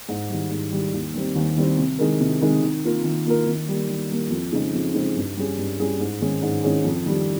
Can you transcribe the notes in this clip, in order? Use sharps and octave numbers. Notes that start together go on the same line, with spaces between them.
G#2
D#3 G3
G#2
D#3 G3
D#2
D#3 G3 C4
D#2
D#3 G3 C4
C3
D#3 G#3 D#4 A#4
C3
D#3 G#3 D#4 A#4
D#3
A#3 F4 A#4
D#3
A#3 F4 A#4
D#3
G3 A#3
D#3
G3 A#3
F2
C#3 G#3 C4 D#4
F2
C#3 G#3 C4 D#4
G2
G3 C#4 G#4
G2
G3 C#4 G#4
G#2
D#3 G#3 C#4
G#2
D#3 G#3 C#4
F2
D#3 G3